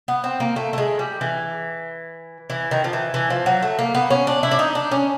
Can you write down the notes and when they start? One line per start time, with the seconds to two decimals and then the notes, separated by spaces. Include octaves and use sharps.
0.08 B3
0.24 C4
0.40 A#3
0.56 A3
0.73 A3
0.78 G#3
0.99 G3
1.21 E3
2.50 E3
2.71 D#3
2.84 F3
2.93 E3
3.14 E3
3.30 F3
3.46 F#3
3.62 A3
3.79 A#3
3.95 B3
4.10 C#4
4.27 D4
4.43 E4
4.51 D4
4.59 D#4
4.75 D4
4.91 C#4